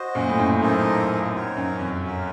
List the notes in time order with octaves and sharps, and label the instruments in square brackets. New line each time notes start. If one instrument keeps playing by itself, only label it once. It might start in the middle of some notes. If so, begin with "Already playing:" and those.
Already playing: [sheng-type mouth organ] F#4 C5 D#5
[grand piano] F#2 A#2
A2
F#2
[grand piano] F#2 [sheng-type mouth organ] A#3 D#4 A4 C5 D#5
[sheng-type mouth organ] C4 D#4 F#4 A#4 C#5
[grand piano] F#2
F2
[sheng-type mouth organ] C#4 F#4 A#4